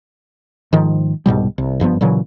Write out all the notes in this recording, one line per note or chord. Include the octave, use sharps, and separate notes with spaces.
G#2 D#3 F3
C2 G#2 B2 G3
C2
F#1 G2 F3 B3
A#2 C#3 E3 F#3